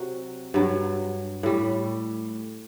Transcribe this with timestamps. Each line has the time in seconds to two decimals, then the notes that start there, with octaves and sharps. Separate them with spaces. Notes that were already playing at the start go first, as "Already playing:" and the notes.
Already playing: C3 F#3 F#4
0.54 G2 F#3
1.43 A2 G3